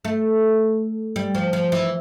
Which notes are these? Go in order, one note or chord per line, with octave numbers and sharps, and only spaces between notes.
A3
G3
F3
F3
E3